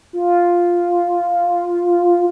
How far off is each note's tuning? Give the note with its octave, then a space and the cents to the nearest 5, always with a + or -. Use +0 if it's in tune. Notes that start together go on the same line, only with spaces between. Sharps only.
F4 +0